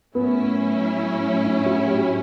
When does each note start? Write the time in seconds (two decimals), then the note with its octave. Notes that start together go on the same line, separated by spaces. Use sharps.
0.15 A2 F#3 B3 C#4 E4
1.44 D4
1.66 F#4
1.87 G4